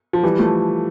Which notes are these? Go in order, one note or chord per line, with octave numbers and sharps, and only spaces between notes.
F3
E3 G3
F3 A3